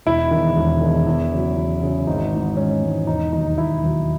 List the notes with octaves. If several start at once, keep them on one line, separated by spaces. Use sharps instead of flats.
E1 E4
E2 D#3
E1
E2 D#3
E2
C#3 F#3
E2
C#3 F#3
G#1 D#4
G#2 E3
G#1 C#4
G#2 E3
E1 D#4
D#2 D#3 F#3 D#4
E1 E4
D#2 D#3 F#3